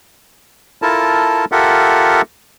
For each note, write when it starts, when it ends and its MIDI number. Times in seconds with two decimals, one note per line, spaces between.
0.82 1.45 64
0.82 1.45 65
0.82 1.45 69
0.82 1.45 70
0.82 1.45 81
1.52 2.22 65
1.52 2.22 67
1.52 2.22 69
1.52 2.22 70
1.52 2.22 76
1.52 2.22 78